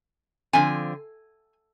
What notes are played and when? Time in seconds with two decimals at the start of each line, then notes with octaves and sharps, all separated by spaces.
0.53 D3 F3 C4 G#5